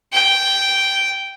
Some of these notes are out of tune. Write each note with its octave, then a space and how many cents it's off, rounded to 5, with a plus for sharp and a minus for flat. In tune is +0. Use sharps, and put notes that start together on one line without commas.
G5 -5